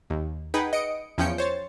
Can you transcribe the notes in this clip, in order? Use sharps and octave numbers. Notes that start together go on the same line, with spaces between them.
D#2
D#4 G#4 B4 F#5 G5
D#5 C#7 D7
E2 F3 C#4 G5 G6 C#7
C5 C#5 A6